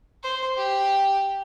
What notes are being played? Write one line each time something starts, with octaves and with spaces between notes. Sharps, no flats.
C5
G4